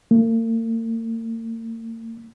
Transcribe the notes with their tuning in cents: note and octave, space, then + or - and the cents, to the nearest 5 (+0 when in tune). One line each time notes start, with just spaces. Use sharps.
A#3 -45